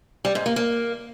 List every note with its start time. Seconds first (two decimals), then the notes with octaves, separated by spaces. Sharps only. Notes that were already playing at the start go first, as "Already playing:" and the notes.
0.25 G3
0.35 G#2
0.46 A#3
0.56 A#3